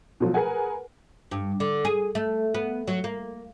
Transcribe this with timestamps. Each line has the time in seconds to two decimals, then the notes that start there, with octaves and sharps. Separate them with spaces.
0.20 B2 F3 F#3
0.34 G#4 A#4 B4 F#5 G#5
1.31 G2
1.60 D3
1.85 G#4
2.15 A3
2.54 B3
2.88 F#3
3.04 A#3